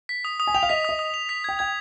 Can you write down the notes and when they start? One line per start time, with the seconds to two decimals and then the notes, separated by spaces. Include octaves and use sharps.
0.09 B6
0.25 D#6
0.40 D#6
0.47 G#5
0.54 G5 F7
0.63 F5
0.69 D#5 B6
0.85 D#5 D#6
0.99 D#6
1.14 F7
1.29 B6
1.44 G5 G#6
1.59 G5 G#6